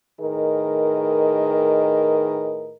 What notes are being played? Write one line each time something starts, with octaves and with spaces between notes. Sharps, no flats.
A2 D#3 G#4 A#4 B4 D#5